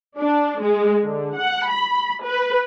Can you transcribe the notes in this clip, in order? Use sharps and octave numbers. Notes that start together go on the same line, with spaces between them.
D4
G#3
D3
F#5
B5
B4